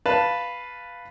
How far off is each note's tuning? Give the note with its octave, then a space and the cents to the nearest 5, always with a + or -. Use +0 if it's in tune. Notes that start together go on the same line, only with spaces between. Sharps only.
B4 +0 F5 +0 A5 +0